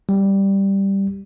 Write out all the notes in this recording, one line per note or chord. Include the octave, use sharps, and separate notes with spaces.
G3